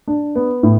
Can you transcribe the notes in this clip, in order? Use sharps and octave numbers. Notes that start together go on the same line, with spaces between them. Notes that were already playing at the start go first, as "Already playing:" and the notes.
D4
B3
A2